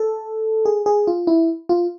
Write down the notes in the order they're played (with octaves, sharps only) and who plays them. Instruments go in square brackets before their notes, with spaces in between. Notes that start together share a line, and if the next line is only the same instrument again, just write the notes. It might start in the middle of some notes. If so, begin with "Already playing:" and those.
Already playing: [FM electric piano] A4
G#4
G#4
F4
E4
F4